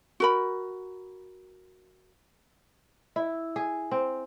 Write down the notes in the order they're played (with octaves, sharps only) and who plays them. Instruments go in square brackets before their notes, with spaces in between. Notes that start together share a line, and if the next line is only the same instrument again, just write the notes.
[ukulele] F#4 A#4 B5
[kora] E4
G#4
C4